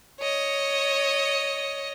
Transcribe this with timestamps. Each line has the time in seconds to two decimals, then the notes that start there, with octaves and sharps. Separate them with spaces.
0.20 C#5 D#5